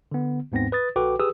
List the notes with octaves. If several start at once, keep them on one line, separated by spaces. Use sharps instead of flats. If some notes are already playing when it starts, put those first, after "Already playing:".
D3 B3
D#2 G#2 B3 C4 A#6
B4 D#6 A6
A#1 F#4 A4 B4 G5 D6
G4 G#4 B4 D#6 E6